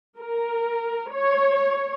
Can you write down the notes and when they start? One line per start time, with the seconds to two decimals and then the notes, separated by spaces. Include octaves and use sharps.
0.19 A#4
1.13 C#5